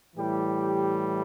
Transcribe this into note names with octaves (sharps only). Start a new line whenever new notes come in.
A2 E3 G3 G4